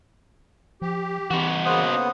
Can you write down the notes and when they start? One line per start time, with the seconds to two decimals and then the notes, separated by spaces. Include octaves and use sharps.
0.82 F3 G4
1.31 E3 D#4 F#4
1.66 C#3 A#3 B3 C5 F#5 D#6